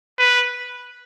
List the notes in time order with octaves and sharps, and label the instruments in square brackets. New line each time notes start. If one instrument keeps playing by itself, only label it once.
[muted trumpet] B4